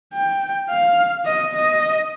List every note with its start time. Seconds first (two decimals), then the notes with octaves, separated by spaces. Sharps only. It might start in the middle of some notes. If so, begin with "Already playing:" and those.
0.13 G5
0.69 F5
1.25 D#5
1.54 D#5